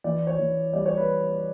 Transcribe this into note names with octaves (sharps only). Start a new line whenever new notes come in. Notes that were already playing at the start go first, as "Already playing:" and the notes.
E3 D5
C#5
E3
G3 D5
C#5
B4